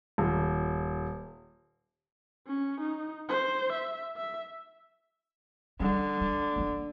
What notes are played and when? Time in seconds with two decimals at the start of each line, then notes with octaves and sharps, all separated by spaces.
0.18 D#1
2.48 C#4
2.81 D#4
3.29 C5
3.73 E5
4.16 E5
5.80 D3 G3
6.21 G#3
6.56 A3 A#3